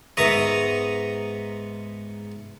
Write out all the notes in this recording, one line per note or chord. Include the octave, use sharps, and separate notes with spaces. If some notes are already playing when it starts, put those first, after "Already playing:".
G#2 B3 E5 A#5 C#6 D#6